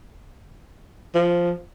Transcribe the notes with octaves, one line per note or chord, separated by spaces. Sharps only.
F3